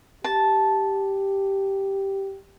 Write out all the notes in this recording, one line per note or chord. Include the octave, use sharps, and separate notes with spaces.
G4 A5